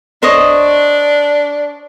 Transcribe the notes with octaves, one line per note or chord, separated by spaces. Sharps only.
D4 C5 C#5 D#5